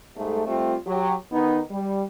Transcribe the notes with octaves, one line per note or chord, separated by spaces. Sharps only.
G#2 G3 A3
G3 A3 C4 F4
F#3 G4
D#3 B3 D#4
G3